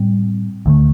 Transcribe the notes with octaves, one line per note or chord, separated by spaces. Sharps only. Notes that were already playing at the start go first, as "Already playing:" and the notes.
Already playing: A2 G3 C4
D2 D3 A3